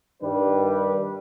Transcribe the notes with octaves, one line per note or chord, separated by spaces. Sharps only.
G2 D#3 G3 D4 B4